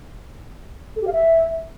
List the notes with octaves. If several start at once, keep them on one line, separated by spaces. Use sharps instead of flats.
A4
G4
F5
E5